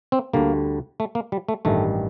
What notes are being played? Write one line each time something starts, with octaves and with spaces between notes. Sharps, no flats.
C4
D2 D3 G3 A#3
A3
A#3
G3
A3
A1 G2 D#3 G3 A3